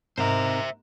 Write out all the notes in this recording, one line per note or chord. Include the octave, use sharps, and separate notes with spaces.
G#2 C3 A#4 C5 E5